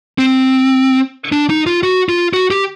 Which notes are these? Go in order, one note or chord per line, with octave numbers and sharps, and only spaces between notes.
C4
D4
D#4
F4
F#4
F4
F#4
G4